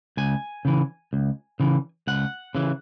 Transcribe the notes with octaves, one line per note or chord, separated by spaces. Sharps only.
C#2 G#5
C#3 E3
C#2
C#3 E3
C#2 F#5
C#3 E3